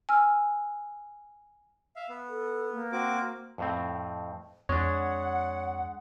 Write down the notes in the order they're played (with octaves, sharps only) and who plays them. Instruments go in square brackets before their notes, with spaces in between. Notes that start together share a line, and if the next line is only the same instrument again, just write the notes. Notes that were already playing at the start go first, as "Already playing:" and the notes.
[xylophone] G#5 E6 F6
[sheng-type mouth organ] E5 F5
B3
[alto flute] A4
A#3
[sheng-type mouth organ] C4 F#4 D6
[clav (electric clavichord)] F2 A2 C4
[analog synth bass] F2 [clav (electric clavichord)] G#3 D4 [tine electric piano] C#5 [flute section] F#5